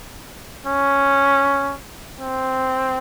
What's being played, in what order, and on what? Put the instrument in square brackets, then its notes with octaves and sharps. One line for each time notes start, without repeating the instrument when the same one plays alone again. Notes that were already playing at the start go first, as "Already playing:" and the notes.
[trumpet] C#4
C4